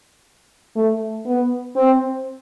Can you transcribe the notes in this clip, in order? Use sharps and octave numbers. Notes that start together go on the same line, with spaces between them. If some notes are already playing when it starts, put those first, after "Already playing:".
A3
B3
C4